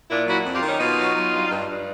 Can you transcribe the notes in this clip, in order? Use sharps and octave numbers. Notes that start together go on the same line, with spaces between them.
A#2 D4 E4
F#3 E4 F#4
F2
F4 G4
D#3
C#4 D#4
B2 D#4 F4
F#3
F#3
G2
G2
G2